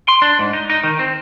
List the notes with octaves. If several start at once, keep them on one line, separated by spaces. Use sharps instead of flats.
C6
D4
G#2
D#4
D#4
D#3
C4